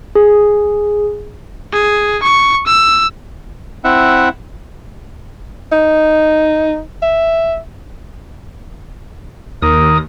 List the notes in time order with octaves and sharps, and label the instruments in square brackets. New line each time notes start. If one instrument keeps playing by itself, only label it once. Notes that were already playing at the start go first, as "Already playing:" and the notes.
[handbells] G#4
[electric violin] G#4
C#6
E6
[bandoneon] C4 E4 E5 F#5
[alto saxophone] D#4
E5
[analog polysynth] D#2 [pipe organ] A#4 D#6